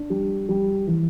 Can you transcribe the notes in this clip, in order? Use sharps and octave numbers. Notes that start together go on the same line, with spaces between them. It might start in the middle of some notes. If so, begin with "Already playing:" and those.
Already playing: D4
G3
G3
E3